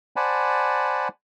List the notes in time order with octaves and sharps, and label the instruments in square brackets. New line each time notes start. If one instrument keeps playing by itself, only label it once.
[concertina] C5 D5 F#5 G#5 A5 B5